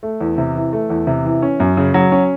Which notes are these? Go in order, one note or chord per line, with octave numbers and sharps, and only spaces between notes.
A3
E2
C3
E3
A3
E2
C3
E3
C#4
F#2
C#3
F#3
C#4